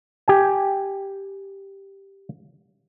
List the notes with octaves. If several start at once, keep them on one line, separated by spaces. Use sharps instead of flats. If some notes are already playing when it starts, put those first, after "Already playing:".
G4 G#5